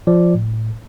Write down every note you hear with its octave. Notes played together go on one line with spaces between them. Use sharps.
F3 D5
A2